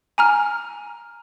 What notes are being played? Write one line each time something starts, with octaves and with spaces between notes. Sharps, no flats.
G#5 A#5 F6